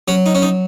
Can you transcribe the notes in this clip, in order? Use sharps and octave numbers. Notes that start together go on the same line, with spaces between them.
F#3 C#4
D#4
C#4
D#4